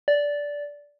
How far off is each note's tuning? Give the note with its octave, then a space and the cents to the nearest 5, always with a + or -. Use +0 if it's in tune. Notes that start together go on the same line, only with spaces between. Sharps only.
D5 -15